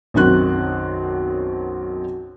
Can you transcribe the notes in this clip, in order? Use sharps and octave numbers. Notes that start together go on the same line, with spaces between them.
B1 F#2 D#3 C4 F#4 F#6